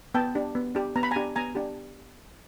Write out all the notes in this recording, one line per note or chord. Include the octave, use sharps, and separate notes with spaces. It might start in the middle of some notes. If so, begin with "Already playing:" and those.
B3 G5 A5
D4 G4
B3
D4 G4
B3 A#5
B5
G#5 A#5
D4 G4
B3 G#5 A#5
D4 G4